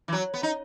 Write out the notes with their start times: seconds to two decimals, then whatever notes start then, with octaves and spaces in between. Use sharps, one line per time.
0.08 E3
0.13 F#3
0.34 B3
0.43 D#4